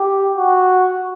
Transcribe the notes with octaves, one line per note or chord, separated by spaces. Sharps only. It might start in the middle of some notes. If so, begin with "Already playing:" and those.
Already playing: G4
F#4